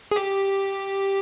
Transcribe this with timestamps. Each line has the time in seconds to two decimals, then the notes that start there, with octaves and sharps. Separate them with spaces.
0.11 G#4
0.16 G4